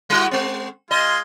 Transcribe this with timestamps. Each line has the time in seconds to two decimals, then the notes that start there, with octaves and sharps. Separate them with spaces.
0.10 G3 E4 F#4
0.31 G#3 C4
0.91 G#3 F4 D#5 C6